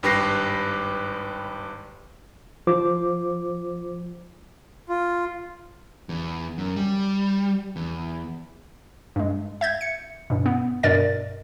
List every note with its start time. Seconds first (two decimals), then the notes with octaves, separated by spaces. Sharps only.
0.03 G#1 G2 G4 B4 A#6 C7
2.67 F3 F4 C5 D6
4.89 F4
6.09 E2
6.58 F#2
6.76 G3
7.76 E2
9.16 G2 G#3
9.61 E5 G6 G#6
9.81 C#7
10.30 G2 B2
10.46 B3
10.83 G2 B2 A#4 D5 D#5 A6